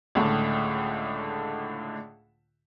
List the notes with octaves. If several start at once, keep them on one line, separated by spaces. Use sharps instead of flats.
C#2 A2 D3